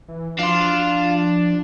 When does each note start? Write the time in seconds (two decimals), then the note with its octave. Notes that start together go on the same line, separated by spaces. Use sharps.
0.08 E3
0.39 F3 D4 F5 C6